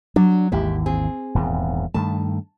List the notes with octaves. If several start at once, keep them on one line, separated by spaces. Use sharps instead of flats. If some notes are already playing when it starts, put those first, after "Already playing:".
F#3 D4
G#1 D#2 E3 G#3 E4 G4
C4 G#4
D#1 E2 G#2
G2 D#3 A3 A5